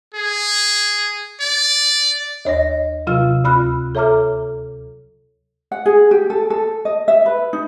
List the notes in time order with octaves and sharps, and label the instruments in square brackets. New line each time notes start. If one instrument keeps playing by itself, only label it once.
[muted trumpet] G#4
D5
[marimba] D#2 C#5 D#5 A#6
C3 F#3 F4 E6 F6
D2 F4 B5 F6 F#6
A4 C#5 E5 A#5 D6 F6
[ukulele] F#5
G#4
G4
A4
A4
D#5
E5
B4
D#4